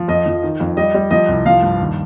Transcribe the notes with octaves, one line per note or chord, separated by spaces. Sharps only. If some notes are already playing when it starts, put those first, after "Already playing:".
Already playing: F3
F2 D#5
F3
D#3
F2
G3 D#5
G3
F3 D#5
C2
F3 F5
G2
D#2